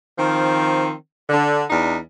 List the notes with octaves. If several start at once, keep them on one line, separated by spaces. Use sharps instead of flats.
D#3 F3 C4
D3
E2 D4 D#4